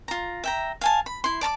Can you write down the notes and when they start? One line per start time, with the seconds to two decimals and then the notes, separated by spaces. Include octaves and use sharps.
0.08 F4 A#5
0.44 E5 G5 A#5
0.81 F5 G#5 A5
1.06 B5
1.24 E4 C6
1.41 D5 A5 A#5 D6